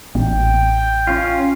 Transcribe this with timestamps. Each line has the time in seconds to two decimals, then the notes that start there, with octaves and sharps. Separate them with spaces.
0.15 A1 G5
1.07 C#4 F4